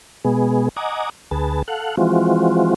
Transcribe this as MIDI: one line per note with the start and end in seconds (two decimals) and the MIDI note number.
0.25 0.69 47
0.25 0.69 56
0.25 0.69 59
0.25 0.69 68
0.77 1.10 75
0.77 1.10 78
0.77 1.10 80
0.77 1.10 82
0.77 1.10 86
0.77 1.10 87
1.31 1.62 38
1.31 1.62 68
1.31 1.62 71
1.31 1.62 81
1.68 1.96 69
1.68 1.96 77
1.68 1.96 78
1.68 1.96 90
1.97 2.74 52
1.97 2.74 53
1.97 2.74 56
1.97 2.74 60
1.97 2.74 65
1.97 2.74 66